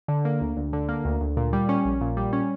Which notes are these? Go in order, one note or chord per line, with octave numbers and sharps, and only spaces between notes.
D3
A#3
D2
D2
D3
A#3
D2
D2
A#2
G3
C#4
A#1
A#2
G3
C#4